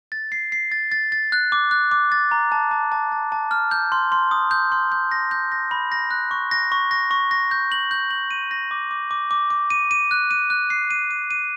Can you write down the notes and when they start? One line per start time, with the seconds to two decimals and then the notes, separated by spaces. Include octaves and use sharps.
0.12 A6
0.32 C7
0.52 C7
0.72 A6
0.92 A6
1.12 A6
1.32 F#6
1.52 D6
1.71 F#6
1.91 D6
2.12 A6
2.31 A#5
2.52 A5
2.71 A5
2.92 A5
3.12 A5
3.32 A5
3.51 F6
3.71 G6
3.92 C6
4.12 C6
4.31 D#6
4.51 G6
4.72 C6
4.92 G6
5.12 A#6
5.31 G6
5.52 A#6
5.71 B5
5.92 A#6
6.11 F#6
6.31 C#6
6.51 A#6
6.72 C#6
6.91 A#6
7.11 C#6
7.31 A#6
7.51 G6
7.72 F#7
7.91 G6
8.11 F#7
8.31 D#7
8.51 A#6
8.71 D6
8.91 D6
9.11 D6
9.31 D6
9.50 D6
9.70 D#7
9.91 D#7
10.11 F#6
10.31 D#7
10.50 F#6
10.70 C7
10.91 D#7
11.11 D#7
11.31 D#7